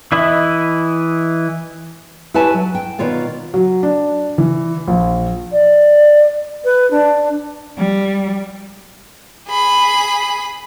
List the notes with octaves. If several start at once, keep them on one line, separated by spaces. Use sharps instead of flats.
E3 E4 D#5 E5 B5
E4 G4 B4 C#5 G#5 A5
F#3
G5
B2 D#3 F4 C#5 D5
F#3
D4
E3
A#1
D5
B4
D4
G3
G#4 B5